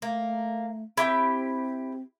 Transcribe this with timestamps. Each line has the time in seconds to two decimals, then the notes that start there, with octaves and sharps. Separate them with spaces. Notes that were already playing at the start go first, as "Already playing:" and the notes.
0.02 A3 A#3
0.97 C4 E4 G4 G5